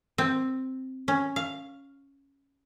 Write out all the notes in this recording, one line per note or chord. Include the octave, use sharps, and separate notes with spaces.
C4
C#4
F5